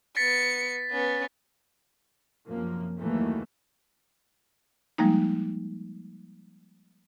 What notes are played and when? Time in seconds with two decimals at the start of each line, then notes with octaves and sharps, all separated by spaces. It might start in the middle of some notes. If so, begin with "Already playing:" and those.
0.17 B3 A6 B6 C#7
0.92 B3 C#4
2.48 F#2 C3 F3 A#3
2.99 D#2 D#3 E3 F#3 A3 A#3
4.98 F3 G3 G#3 A#3 D#4